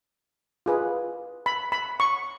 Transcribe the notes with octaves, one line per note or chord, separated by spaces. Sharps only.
F4 G#4 B4
B5
B5
C#6